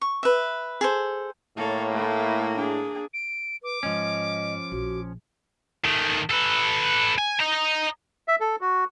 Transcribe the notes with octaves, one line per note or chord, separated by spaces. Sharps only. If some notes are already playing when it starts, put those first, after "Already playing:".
C#6
B4 E5
G#4 A4 C5
A2 A#3 A4 C#5
A3 E4
D4 G#4
D7
B4 D6
G#2 F3 C#4 D#5
A#1 F#4
D#3 A3
A4 B4
G#5
D#5 A#5
E5
A4
F#4